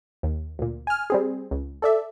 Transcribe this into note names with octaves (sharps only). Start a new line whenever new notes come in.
D#2
D2 A#2
G#5 F6
G3 C4 G#4
C#2
A4 D5 E5